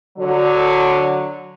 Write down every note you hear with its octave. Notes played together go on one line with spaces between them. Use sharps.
D3 F#3